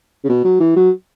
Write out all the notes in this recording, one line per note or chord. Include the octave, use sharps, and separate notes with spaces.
C#3
B2
F#3
E3
F#3